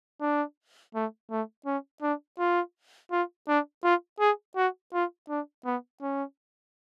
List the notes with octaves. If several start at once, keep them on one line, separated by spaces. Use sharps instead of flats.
D4
A3
A3
C#4
D4
F4
F4
D4
F4
G#4
F#4
F4
D4
B3
C#4